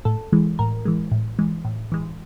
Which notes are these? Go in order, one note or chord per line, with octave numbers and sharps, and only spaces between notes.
A2 A4
E3 G#3
A2 A#4
E3 G#3
A2
E3 G#3
A2
E3 G#3